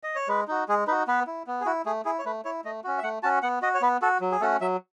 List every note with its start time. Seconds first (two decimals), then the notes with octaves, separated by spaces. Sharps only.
0.03 D#5
0.15 C#5
0.28 G#3 B4
0.48 D#4 F#4
0.68 G#3 G#4
0.87 D#4 F#4 B4
1.07 B3 B4
1.27 E4
1.47 B3
1.61 G#4
1.66 E4 F#4
1.86 A3 G#4
2.05 E4 G#4
2.19 C#5
2.25 A3 B4
2.45 E4 C#5
2.65 A3 D#5
2.84 C#4 F#4
2.98 E5
3.03 A3 F#5
3.23 C#4 F#4 A5
3.42 B3 F#5
3.62 F#4 D#5
3.75 C#5
3.81 B3 B4
4.02 F#4 A4
4.21 F#3
4.32 G#4
4.40 A3 C#4 F#4 A4
4.61 F#3 E5